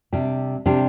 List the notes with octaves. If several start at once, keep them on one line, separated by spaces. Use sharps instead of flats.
C3 G3 D4 G4
C3 G3 D4 G4